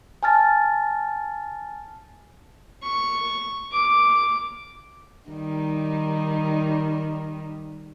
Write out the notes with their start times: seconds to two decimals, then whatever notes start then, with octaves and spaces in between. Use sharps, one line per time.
0.23 G#5 A5 F6 A6
2.83 C#6
3.72 D6
5.29 D#3 G3 D#4